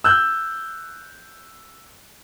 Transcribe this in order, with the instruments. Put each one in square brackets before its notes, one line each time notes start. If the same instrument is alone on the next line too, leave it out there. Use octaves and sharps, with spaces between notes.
[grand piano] E6 F#6 G6